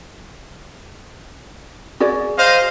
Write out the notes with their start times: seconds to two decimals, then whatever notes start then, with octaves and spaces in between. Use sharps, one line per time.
2.00 F#4 G#4 D5
2.39 C5 D#5 F5